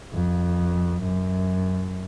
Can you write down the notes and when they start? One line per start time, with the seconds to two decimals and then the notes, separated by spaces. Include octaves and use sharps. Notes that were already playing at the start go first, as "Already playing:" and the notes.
0.13 F2
1.03 F#2